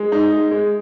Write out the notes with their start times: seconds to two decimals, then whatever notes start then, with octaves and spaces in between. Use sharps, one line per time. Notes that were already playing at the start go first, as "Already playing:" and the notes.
Already playing: G#3
0.12 D#4
0.32 G#3
0.51 G#3